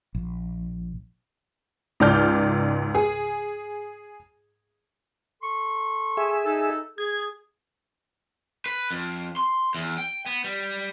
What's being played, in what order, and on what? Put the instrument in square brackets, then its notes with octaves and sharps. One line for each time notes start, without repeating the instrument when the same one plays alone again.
[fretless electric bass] A#1
[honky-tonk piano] C#2 G#2 D5 F6 G6
G#4
[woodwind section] A4 C6 C#6
[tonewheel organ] G#4 E5
[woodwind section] D#4 A4
[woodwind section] G#4 [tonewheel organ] G#6
[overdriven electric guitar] B4
F2
C6
E2
G5
B3
G3